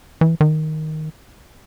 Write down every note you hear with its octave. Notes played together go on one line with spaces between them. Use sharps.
E3
D#3